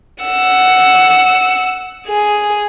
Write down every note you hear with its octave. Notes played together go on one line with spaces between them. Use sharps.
F#5 E6
G#4